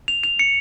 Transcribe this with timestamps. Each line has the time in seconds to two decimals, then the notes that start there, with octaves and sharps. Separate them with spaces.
0.08 F7
0.23 F7
0.39 C#7